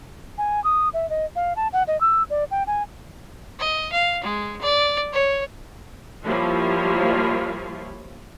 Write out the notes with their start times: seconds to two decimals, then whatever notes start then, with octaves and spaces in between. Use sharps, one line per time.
0.38 G#5
0.64 D#6
0.94 E5
1.10 D#5
1.36 F5
1.56 A5
1.73 F#5
1.88 D#5
2.01 E6
2.30 D5
2.51 G5
2.67 G#5
3.60 D#5
3.92 F5
4.23 G#3
4.62 D5
5.13 C#5
6.24 F3 G3 A#3 E4 F4 C#5